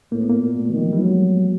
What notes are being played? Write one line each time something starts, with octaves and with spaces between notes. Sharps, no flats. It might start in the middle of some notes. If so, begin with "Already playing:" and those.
A2 A#3
B3
A#3
A#2
A3
D#3 E3
F3
F#3
G3
F#3 G#3